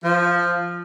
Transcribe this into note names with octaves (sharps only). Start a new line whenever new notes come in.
F3